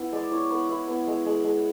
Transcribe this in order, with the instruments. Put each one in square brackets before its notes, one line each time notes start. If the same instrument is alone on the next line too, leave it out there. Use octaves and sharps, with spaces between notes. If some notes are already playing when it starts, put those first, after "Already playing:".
Already playing: [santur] B3 E4
G#3 D5
E4 C#5
B3 B4
E4 B4
B3 B4
G#3
G#3
G#3